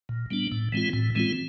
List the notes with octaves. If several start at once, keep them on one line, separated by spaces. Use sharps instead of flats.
A#2
G3 B3 D4
A2
E3 G#3 C4 F4
A2
E3 G#3 C4 F4